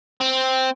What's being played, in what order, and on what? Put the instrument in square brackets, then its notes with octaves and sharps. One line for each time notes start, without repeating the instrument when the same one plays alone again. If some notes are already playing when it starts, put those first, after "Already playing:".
[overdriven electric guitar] C4